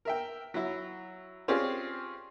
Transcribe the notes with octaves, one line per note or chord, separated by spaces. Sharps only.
A#4 E5 G5
F#3 E4
C4 C#4 F4 G4 G#4 D5